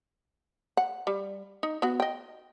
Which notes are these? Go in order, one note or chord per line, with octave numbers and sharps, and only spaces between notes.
F#5
G3
D#4
B3 F#4
D#5 G5